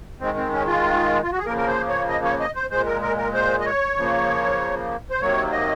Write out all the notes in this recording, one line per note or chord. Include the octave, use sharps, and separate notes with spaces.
D#3 G#3 C4
C4
C#4
F4
F4
F#4
G#4
C#3 F3 A#3 A#4
A#4
C5
C#5
D#5
C#5
D#5
C5
A#2 G#3 C5
A#4
A#4
A#4
C5
D#5
C#5
C#3 F3 A#3
C5
C3 D#3 F#3 A#3 C#5
D#5